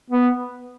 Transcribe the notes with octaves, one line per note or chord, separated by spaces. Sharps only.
B3